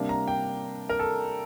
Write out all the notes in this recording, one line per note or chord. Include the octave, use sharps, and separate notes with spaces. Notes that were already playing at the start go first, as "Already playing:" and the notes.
Already playing: C3 G3 A#3 D4
A#5
G5
A#4
A4